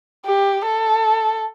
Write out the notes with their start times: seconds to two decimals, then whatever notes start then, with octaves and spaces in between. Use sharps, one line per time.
0.26 G4
0.65 A4